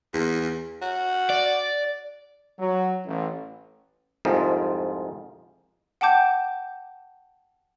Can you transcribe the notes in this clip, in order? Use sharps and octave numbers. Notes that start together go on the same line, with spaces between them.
E2
F#4
D5
F#3
A1
C2 F2 G#2 F3
F#5 G5 A5 D6 G6